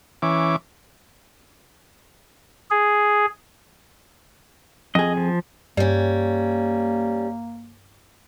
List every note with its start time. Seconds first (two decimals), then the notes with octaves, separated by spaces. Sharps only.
0.22 E3 C#4 D6
2.71 G#4
4.95 F2 G#4 D#5
5.17 F3
5.77 G2 G3 A#3 C#4